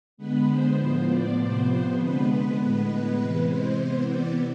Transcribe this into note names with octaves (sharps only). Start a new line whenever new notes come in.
D3 G#3 B3 B4
C5
A2 F3 B3
D5
C3 F3 B3 C5
D3 G#3 B3 B4
B4
A2 G#3 B3 B4
C3 E3 G#3
C5
C3 E3 B3
D5